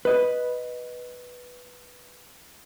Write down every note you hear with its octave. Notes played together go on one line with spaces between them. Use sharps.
B4 D#5